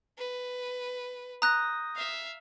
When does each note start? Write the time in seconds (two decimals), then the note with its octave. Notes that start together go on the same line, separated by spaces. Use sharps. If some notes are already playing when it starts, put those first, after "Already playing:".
0.18 B4
1.42 A#5 D#6 F#6 G6 A#6
1.96 E5 F5